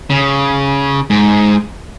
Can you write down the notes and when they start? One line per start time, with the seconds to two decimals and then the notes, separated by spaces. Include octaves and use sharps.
0.10 C#3
1.10 G#2